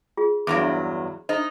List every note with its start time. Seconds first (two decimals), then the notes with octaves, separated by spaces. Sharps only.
0.17 F4 G#4
0.47 E2 G2 F#3 D6
1.29 D#4 C5 D#5